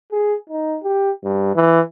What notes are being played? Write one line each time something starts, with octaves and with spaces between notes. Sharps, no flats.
G#4
D#4
G4
G2
E3